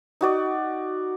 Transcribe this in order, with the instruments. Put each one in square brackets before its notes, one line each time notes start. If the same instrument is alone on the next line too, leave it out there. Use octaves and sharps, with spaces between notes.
[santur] D#4 F#4 D5